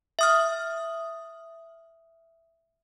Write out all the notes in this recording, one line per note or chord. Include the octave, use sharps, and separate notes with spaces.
E5 D#6 F6